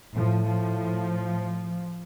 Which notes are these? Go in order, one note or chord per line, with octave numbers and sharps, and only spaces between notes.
A2 F3
F3